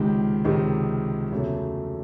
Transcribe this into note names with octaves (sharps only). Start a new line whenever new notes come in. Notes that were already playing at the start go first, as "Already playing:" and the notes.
Already playing: C#2 C3 D#3 G#3 G4
C#2 C3 D#3 G#3 G#4
E2 C#3 F#3 A3